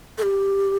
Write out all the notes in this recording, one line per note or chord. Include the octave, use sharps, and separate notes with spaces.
A4
G4